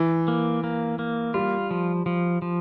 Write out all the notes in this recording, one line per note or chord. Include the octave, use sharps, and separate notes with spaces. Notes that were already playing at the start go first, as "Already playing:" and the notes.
Already playing: E3
A#3
A#3
A#3
G3 F4
F3
F3
F3